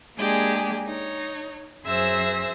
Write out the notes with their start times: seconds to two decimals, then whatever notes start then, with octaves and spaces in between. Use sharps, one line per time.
0.17 G#3 A#3 D4 G4 G#4
0.86 D#4 C#5
1.86 F#2 G#4 C5 E5 E6 A#6